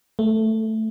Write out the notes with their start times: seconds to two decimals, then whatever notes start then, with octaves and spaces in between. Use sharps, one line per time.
0.19 A3